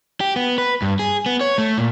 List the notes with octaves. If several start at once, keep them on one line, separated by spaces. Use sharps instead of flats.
G4
B3
B4
G2
G#4
B3
C#5
A3
A#2